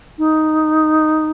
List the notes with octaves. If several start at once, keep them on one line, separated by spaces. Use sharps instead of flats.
D#4